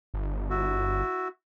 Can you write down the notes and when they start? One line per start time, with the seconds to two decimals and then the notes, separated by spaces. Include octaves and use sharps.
0.14 G1
0.50 E4 F#4